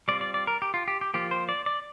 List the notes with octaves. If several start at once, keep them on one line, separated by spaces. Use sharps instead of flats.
G3 C4 F4 D5
D5
D5
A#4
G4
F4
G4
G4
F3 A#3 F4 G4
C5
D5
D5